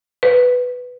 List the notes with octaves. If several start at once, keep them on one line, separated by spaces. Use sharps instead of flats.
B4